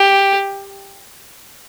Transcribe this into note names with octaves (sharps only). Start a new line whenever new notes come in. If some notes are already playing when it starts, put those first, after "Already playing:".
Already playing: G4